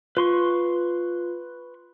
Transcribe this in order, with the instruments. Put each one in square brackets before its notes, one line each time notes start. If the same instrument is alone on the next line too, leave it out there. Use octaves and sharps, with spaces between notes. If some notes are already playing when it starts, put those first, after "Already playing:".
[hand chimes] F4 [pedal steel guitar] B4 C6 C#6